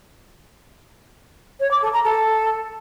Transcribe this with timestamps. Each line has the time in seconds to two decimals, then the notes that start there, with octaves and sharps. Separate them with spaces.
1.60 C#5
1.71 D6
1.82 A4
1.93 A#5
2.04 A4